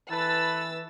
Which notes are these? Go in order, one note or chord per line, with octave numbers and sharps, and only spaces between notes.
E3 A4 B4 E6 A6